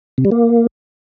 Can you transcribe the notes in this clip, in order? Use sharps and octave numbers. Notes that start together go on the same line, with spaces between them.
C3
G3
A#3